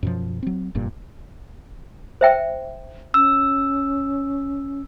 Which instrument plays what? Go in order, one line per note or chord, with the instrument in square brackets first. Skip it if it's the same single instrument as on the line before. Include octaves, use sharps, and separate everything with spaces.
[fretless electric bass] F#2 B2 F3
F#3 C4
F1 G2 A#2
[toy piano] C5 E5 G5
[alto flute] C#4 [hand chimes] E6